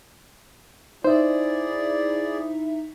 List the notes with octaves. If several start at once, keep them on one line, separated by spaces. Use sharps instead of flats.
D#4 E4 G#4 C5 D5 E5